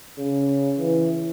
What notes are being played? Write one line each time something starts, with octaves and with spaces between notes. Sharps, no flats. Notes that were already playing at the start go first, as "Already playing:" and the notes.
C#3
E3